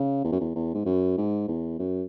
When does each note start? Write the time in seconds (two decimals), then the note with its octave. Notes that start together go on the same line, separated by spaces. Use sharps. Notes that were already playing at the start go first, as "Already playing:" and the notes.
Already playing: C#3
0.24 E2
0.32 F#2
0.41 E2
0.56 E2
0.74 G#2
0.86 F#2
1.17 G#2
1.48 E2
1.79 F#2